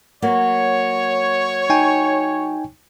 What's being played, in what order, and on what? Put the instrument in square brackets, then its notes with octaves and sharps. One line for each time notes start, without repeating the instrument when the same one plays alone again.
[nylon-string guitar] F#3 A#3 [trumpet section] C#5
[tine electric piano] D#4 G5 G#5